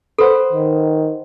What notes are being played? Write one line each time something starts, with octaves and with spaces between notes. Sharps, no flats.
A4 B4 C5 F#5
D#3